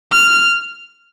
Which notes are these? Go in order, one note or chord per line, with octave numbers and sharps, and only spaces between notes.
F6